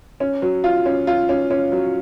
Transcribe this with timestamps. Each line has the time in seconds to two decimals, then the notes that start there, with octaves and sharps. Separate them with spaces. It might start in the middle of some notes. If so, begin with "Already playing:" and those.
0.20 C#4
0.42 F#3
0.64 F4
0.86 C#4
1.07 F4
1.29 C#4
1.50 C#4
1.72 F#3